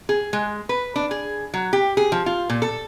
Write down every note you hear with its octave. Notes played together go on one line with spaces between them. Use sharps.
G#4
G#3
B4
D4
G#4
F#3
G4
G#4
F3
F4
A#2
A4